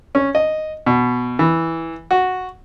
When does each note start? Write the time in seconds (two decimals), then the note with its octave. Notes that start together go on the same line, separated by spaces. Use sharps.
0.15 C#4
0.35 D#5
0.86 B2
1.39 E3
2.11 F#4